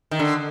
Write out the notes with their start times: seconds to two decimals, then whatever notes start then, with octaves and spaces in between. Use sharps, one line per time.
0.11 D#3
0.19 D3